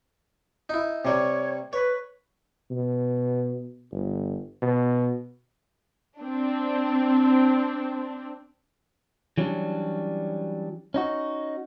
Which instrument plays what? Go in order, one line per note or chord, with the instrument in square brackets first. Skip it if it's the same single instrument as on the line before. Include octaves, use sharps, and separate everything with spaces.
[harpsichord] D#4 E4
[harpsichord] C3 G3 [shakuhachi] C#5
[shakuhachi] B4 [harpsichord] C#5
[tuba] B2
G1
B2
[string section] C4 D4
[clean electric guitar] E3 F#3 G3 C#4 D4
C#4 D#4 F#4